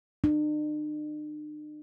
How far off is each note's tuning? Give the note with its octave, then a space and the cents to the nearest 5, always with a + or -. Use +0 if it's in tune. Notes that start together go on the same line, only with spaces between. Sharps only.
D4 +45